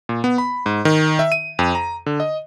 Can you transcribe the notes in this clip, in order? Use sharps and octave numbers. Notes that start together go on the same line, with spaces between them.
A#2
B3
B5
G#2
D#3
E5
D#7
F2
A#5
D3
D#5